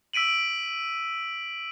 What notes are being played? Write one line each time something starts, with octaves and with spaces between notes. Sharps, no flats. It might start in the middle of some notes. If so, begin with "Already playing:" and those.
E6 B6 D7 D#7 F#7